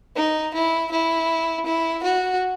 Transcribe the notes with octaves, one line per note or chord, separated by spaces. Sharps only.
D#4
E4
E4
E4
F#4